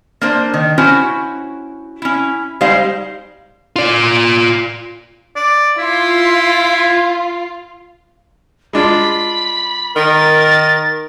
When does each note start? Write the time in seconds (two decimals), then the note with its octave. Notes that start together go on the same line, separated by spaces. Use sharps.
0.21 A#3 D4 C5
0.54 D#3
0.78 C#4 E4 F#4 C5
2.02 C#4 E4
2.61 G3 G#3 D#4 C5 F5
3.76 F4 D5
5.36 D5
5.78 E4 F4
8.73 G#3 D4 F4 B5
9.96 D#3 A#4 A6